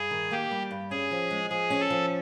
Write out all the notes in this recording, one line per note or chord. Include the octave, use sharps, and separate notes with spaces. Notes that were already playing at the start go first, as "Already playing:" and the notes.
Already playing: G2 G#4
D#3
A#3 G4
G3
G2
C#4 G#4
F3
G#3
F3 G#4
C#4
A4
F3